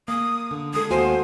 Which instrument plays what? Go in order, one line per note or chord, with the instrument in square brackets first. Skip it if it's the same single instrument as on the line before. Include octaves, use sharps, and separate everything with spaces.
[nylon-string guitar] A#3 [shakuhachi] D#6
[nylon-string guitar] D3
[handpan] G#3 A4 [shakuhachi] D#6
[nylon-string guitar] D#2 A#3 G#5 [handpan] F#4 [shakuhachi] C5